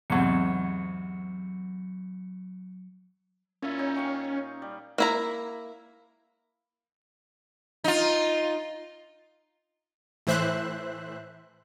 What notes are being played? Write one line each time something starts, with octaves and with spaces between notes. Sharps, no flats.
E2 G#2 C3 F#3 C#7
A#2 C#4 E4
D#4
F5 G5 C#6
G3
A#3 E4 A#5
D#4 F4
A2 E3 C5 E5 F#6